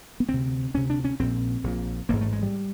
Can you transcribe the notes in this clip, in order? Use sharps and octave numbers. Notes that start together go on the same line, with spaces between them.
B3
D2 C3 C4
D2 C3 C#4
D4
C#4
A#1 A#2 C4
A#1 A#2
A1 G#2 A#3
A3
G#3
G3